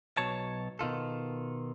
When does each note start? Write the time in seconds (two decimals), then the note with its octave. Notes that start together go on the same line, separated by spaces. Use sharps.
0.17 B1 B2 F#3 C#5 A5
0.79 B2 D#3 F4 A4